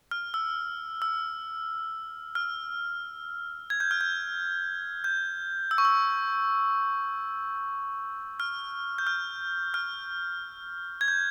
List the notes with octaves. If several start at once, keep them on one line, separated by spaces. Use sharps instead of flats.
F6
E6
E6
F6
G#6
G6
F6
G6
G6
E6
C#6
E6
F6
G6
F6
F6
G#6
G6